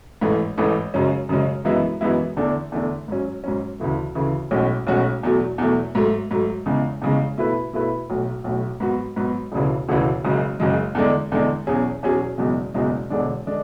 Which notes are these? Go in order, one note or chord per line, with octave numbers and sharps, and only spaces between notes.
A1 G#2 E3 A3
A1 G#2 E3 A3
F#2 C#3 G#3 C#4
F#2 C#3 G#3 C#4
F#2 E3 G#3 B3 E4
F#2 E3 G#3 B3 E4
E2 D3 A3 D4 A4
E2 D3 A3 D4 A4
G#2 F#3 C#4
G#2 F#3 C#4
D2 C#3 E3 A3
D2 C#3 E3 A3
B1 A2 G#3 C#4 F#4
B1 A2 G#3 C#4 F#4
E2 B2 F#3 A3
E2 B2 F#3 A3
G#2 F#3 A3
G#2 F#3 A3
E2 C#3 G#3
E2 C#3 G#3
B2 A3 E4 B4
B2 A3 E4 B4
B1 A2 F#3
B1 A2 F#3
G#2 F#3 B3 F#4
G#2 F#3 B3 F#4
E1 D2 C#3 E3
E1 D2 C#3 E3
F#1 F#2 C#3 G#3
F#1 F#2 C#3 G#3
E2 D3 G#3 D4
E2 D3 G#3 D4
E2 B2 F#3 C#4 G#4
E2 B2 F#3 C#4 G#4
F#1 E2 B2 G#3
F#1 E2 B2 G#3
E1 E2 D3 G#3 D4
D3 G#3 D4